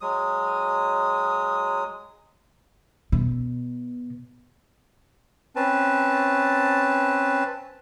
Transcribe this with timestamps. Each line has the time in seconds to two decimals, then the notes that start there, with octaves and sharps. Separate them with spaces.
0.01 F#3 G#3 D#6
3.12 B2
5.56 C4 C#4 B4 A5